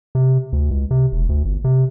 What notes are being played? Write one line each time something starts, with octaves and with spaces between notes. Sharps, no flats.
C3
D2
C#2
C3
E1
D2
G1
C3